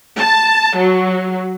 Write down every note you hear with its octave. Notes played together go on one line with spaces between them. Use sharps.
A5
F#3